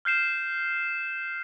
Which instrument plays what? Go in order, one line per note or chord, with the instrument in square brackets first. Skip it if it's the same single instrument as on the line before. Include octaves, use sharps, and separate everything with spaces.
[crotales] F6 G6 C7 E7